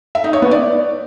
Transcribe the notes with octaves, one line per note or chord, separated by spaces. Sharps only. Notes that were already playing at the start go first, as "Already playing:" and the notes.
E5
D#4
C#5
B3
D5